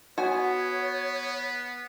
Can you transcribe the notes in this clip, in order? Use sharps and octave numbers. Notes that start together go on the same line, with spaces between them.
B3 F#4 C#5 G#5